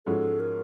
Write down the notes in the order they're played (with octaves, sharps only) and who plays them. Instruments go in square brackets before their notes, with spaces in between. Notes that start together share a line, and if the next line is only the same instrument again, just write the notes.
[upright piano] G#2 F3 G#3 C#4 F#4 [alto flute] A4
[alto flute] A#4